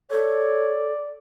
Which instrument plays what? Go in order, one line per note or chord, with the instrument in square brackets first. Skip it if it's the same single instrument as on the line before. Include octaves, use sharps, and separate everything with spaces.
[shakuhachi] A4 [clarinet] C#5 [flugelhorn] D5